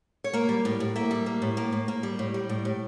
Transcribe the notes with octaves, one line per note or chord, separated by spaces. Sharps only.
C#5
A#3 A#4
G3
A2
A2
A#3 E5
G3
A#3
A2
A#3
A2
A#3
G3
A2
G3
A2
A2